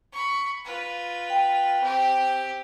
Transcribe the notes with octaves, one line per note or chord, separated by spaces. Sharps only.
B5 C#6
F4 B4
G5
C4 G4